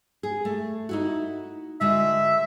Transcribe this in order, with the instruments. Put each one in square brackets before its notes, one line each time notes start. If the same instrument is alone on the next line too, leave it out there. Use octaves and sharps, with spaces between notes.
[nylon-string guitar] G#4
A3
D#4 E4 F#4
[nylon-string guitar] D3 G#3 F#4 [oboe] E5